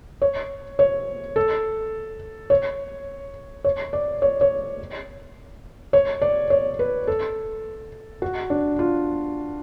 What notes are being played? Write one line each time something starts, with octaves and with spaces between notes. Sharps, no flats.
C#5
C#5
A4
C#5
C#5
D5
C#5
C#5
C#5
D5
C#5
B4
A4
F#4
D4
F4